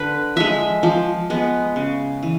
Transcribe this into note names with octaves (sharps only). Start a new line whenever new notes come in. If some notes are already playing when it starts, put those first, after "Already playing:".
Already playing: D3 B4
F3 G#3 E5
F3
G#3 B3
C#3
E3